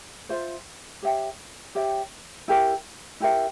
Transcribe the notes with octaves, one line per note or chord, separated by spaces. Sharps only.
F4 C5 E5
G4 C#5 E5 G5
G4 C#5 E5 G5
E4 G4 A#4 E5
E4 G4 A#4 E5